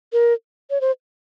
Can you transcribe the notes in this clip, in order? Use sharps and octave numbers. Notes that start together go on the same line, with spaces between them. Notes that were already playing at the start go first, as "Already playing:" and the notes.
A#4
C#5
C5